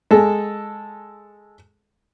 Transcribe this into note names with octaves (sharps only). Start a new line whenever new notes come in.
G#3 A4